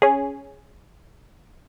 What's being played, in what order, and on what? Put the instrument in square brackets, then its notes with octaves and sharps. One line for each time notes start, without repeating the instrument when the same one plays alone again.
[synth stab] C#4 G#4